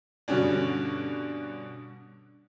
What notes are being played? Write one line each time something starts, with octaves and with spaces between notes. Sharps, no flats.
G2 B2 D3 C#4 D4